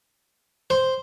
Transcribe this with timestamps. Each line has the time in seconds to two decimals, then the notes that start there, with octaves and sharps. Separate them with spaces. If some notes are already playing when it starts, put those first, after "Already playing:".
0.70 C5